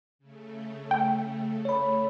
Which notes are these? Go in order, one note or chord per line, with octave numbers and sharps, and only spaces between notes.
C#3 A3
G5
C#5 B5